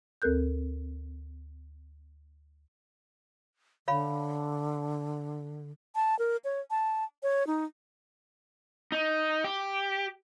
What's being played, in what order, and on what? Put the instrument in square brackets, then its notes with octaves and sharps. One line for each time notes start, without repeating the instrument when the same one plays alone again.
[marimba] D2 C4 A4 A#4 F#6 G6
[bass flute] D3 [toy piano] C#5 F5 B5
[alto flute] A5
A#4
C#5
A5
C#5
D#4
[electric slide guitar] D#4
G4